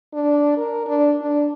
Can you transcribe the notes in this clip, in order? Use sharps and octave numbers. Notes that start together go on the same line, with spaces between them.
D4
A#4
D4
D4